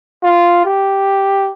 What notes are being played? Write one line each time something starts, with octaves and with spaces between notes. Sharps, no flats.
F4
G4